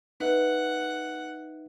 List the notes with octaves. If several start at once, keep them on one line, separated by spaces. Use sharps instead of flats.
D#4 B4 E5 F#5